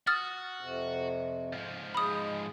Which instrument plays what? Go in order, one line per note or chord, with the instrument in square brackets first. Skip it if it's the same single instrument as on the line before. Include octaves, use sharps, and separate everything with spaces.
[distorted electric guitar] F#4 [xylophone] D#6 F6 A6
[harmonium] F2 C3
[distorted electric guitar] G#2 F3
[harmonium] G#3 [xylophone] B5 D#6